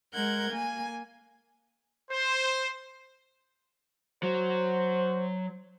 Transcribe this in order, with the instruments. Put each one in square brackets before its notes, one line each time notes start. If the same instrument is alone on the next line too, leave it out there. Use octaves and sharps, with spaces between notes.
[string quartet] G#3 A#4 F#5 G6 G#6
A#3 G#5
[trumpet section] C5
[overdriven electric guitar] F#3 [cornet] C5